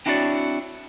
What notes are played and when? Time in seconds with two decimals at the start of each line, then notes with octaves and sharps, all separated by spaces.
0.06 C4 D4 E4 F#4 C#5 D5